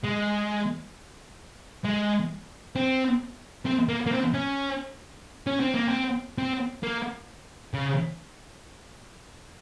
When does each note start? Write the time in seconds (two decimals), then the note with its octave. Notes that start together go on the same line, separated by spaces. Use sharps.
0.04 G#3
1.85 G#3
2.76 C4
3.66 C4
3.89 A#3
4.07 A#3
4.11 C4
4.34 C#4
5.47 C#4
5.61 C4
5.74 A#3
5.88 C4
6.38 C4
6.83 A#3
7.74 C#3